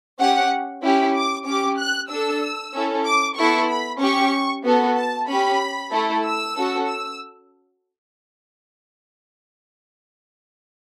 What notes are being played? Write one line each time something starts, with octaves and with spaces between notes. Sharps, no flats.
C#4 G4 F#5
C#4 E4 G4 B5
D6
C#4 G4 D6
F#6
D4 A4 E6
C#4 E4 A4
D6
B3 E4 A4 C#6
B5
C#4 G4 C#6
B3 F#4 A4
A5
C#4 G4 B5
A3 E4 A4
E6
C#4 F#4 A4
E6